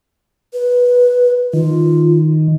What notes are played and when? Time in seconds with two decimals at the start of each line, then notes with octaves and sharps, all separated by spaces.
0.53 B4
1.53 D#3 F4